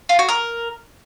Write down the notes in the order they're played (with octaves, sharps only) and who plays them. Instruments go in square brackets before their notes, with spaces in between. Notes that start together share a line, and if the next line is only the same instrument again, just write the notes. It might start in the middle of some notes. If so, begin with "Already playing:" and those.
[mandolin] F4
F#4
A#4